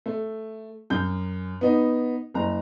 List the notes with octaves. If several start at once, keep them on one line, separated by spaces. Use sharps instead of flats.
A3
F#2 G6
B3 D#4
F#1 A#5